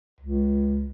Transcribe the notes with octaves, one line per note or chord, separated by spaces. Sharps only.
C#2